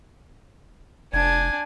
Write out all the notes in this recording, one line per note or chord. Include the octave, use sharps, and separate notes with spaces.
F1 D4 G#5 G#6